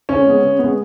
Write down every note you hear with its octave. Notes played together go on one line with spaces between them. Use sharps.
C#3 C#4
G#3 B3
C#3
G#3 B3